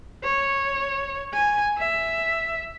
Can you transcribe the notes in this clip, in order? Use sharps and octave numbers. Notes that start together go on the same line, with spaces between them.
C#5
G#5
E5